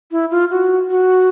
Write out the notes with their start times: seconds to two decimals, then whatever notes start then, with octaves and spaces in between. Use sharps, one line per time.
0.12 E4
0.31 F4
0.51 F#4
0.90 F#4